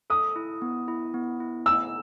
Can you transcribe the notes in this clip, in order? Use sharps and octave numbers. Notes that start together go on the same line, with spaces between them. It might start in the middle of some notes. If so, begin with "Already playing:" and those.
A4 D#6
E4
B3
E4
B3
E4
B3 E6